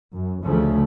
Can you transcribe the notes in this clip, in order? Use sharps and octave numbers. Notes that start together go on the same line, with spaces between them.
F#2
D2 C#3 F3 A3